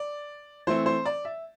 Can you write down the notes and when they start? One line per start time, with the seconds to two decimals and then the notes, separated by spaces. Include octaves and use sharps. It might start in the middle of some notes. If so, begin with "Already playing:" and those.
Already playing: D5
0.67 E3 A3 C4 C5
0.86 C5
1.06 D5
1.25 E5